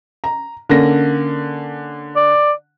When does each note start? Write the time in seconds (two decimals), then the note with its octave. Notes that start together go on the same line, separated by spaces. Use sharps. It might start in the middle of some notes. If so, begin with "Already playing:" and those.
0.24 A#5
0.69 D3 A#3 C#4 A#6
2.16 D5